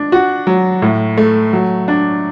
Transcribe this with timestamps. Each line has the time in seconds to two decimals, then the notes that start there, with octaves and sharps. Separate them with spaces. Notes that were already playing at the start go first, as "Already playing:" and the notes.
Already playing: D4
0.12 F#4
0.47 F#3
0.82 A2
1.17 A3
1.53 F#3
1.88 D4